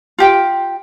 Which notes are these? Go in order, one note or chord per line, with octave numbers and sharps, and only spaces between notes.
F4 G4 G5